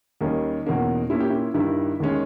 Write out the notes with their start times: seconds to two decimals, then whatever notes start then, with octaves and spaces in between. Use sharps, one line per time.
0.21 D#2 D#3 G3 A#3 C#4 D#4
0.66 E2 B2 A#3 C#4
1.10 A#2 A#3 C#4 E4
1.20 G4
1.30 E4
1.54 G2 D#3 G3 E4
2.00 D#2 D#3 G#3 C#4